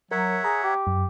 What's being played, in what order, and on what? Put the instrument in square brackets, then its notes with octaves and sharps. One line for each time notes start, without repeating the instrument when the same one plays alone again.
[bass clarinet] F#3 [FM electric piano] A#4 [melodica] C#5 E5 F#5
[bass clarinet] G#4 [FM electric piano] A#5
[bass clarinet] G4
[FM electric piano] F#2